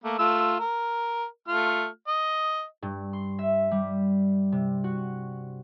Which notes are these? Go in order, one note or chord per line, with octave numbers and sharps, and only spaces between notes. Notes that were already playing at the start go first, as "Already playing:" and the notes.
A3 A#3
A3 F4 E6
A#4
A3 F4 F6
D#5
G2
C6
E5
G3
C3
F#4